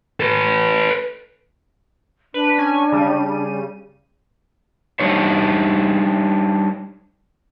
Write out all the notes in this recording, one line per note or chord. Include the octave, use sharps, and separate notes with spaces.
A4 B4
D4 B4
C#4 G#5
C#3 G3 D#7
G3 D4 D#4 C5 C#5